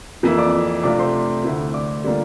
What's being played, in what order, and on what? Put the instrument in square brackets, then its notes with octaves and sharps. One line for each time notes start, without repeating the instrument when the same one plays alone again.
[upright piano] F2 E3 A#3 E4
D5 D6
C3 F3 A3 D4 F4 D5 D6
C5 C6
D2 D3 A3 E4
D5 D6
D3 G3 A#3 D4 F4